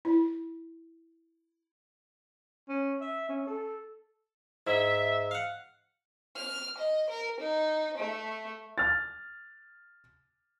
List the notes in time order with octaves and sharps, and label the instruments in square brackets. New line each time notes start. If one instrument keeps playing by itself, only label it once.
[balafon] E4
[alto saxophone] C#4
E5
C#4
A4
[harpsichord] G#2 [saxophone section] E5
[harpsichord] F5 F#5
[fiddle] F6
D#5
A#4
D#4
A3
[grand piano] F6 A6